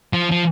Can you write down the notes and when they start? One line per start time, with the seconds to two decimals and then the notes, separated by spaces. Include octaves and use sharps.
0.13 F3
0.31 F3